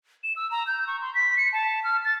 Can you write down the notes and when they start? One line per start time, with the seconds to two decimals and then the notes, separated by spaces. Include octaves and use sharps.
0.24 E7
0.36 E6
0.51 A#5
0.67 G6
0.87 C#6
1.02 C6
1.15 B6
1.37 C#7
1.53 A5
1.84 F6
2.05 A6